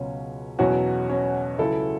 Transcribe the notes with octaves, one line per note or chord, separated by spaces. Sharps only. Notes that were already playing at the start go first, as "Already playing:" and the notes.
Already playing: C#2 B2 F#3 C#4
E2 B2 F#3 C#4 F#4
C#4
C#2 C#3 F#3 E4 A4